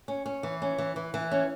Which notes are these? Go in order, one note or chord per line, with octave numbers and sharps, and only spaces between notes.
C#4
C#4
E3
C#4
E3
E3
E3
C#4